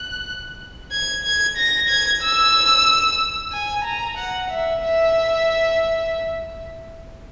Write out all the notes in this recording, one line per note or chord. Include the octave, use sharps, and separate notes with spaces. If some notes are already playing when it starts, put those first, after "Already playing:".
Already playing: F#6
G#6
G#6
A#6
G#6
E6
G#5
A#5
F#5
E5
E5